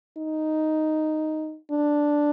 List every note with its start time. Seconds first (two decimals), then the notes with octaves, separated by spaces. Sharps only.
0.18 D#4
1.71 D4